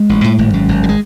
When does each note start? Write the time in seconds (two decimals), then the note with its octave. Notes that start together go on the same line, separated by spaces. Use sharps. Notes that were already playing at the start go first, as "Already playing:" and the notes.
Already playing: G#3
0.09 A1
0.24 A2
0.39 G#1
0.54 F#2
0.69 G#1
0.83 D3
0.89 G#3